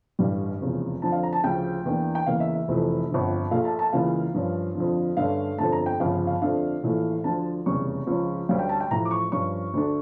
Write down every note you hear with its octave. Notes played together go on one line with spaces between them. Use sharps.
A1 G2 D3 G3
F1 E2 C#3 F3
F2 D3 F3 A5
F5
A#5
A5
D2 C#3 F3 G5
E2 E3 A#3 D4
G5
E2 C#3 E3 A#3 F5
E5
E5
F1 F2 E3 A3
G1 F2 D3
A#1 A#2 A3 F5
A5
A5
C#2 C#3 E3 A#3 F5
G2 F3 C#4
F2 D3 F3
G2 D3 A3 C#4 F5
G1 F2 D3 A3 A5
A#5
G5
G1 F2 C#3 F3 F5
F5
F2 D3 A3 D4 F5
A#1 A2 E3 A3
D2 D3 F3 A5
F1 E2 C#3 G3 C#4 C#6
C#2 C#3 F3 C#4
D2 D3 G3 C#4 F5
G5
A5
G5
A1 A2 F3 A#5
D6
C#6
G2 F3 C#4 C#6
D2 D3 A3 D4